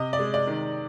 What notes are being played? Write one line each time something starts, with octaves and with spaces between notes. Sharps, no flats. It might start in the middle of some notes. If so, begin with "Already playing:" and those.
Already playing: C3 D#5
D5
G#3
D5
D#3